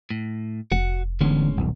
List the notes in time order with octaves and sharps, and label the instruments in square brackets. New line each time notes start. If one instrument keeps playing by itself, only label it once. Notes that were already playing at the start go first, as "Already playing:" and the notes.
[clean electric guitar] A2
[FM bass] F1 [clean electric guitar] F#4 F#5
[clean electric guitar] A2 G#3 C#4 [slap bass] D3 E3 B3
[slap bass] D#1 B1